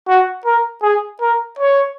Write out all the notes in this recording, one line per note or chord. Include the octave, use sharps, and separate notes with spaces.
F#4
A#4
G#4
A#4
C#5